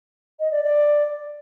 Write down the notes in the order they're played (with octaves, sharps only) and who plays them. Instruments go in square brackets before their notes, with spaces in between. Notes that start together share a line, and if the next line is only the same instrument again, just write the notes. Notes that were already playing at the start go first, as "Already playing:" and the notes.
[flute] D#5
D5
D5